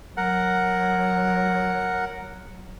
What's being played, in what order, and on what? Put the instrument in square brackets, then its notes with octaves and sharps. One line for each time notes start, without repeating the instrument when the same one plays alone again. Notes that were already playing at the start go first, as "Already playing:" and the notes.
[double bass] F#3 [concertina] A#4 F#5